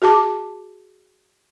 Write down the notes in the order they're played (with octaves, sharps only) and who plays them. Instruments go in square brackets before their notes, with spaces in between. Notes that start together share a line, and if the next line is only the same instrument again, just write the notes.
[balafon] F#4 G#4 A5 D6